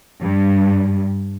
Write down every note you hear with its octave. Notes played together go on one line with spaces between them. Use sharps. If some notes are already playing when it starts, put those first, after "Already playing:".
G2